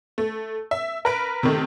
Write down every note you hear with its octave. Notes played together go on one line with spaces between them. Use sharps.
A3
E5
A#4 B4 D7
C3 D#3 A3